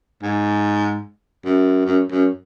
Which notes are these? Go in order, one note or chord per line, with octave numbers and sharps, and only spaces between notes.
G#2
F#2
F#2
F#2